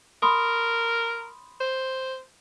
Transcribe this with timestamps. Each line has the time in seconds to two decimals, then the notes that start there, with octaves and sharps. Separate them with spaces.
0.22 A#4 B5 C6 D#6
1.60 C5